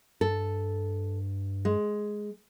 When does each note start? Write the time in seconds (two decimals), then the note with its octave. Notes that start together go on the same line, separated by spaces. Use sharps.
0.21 G2 A4
1.65 G#3